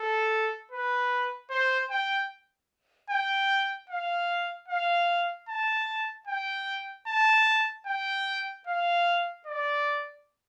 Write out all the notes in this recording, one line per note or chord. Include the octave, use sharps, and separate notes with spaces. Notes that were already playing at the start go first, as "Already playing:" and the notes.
Already playing: A4
B4
C5
G5
G5
F5
F5
A5
G5
A5
G5
F5
D5